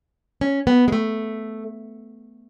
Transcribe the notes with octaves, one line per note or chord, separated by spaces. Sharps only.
C#4
B3
G#3
A3